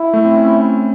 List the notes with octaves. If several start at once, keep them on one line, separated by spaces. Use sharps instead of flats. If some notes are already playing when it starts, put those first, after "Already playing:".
Already playing: E4
A3
C4
C#4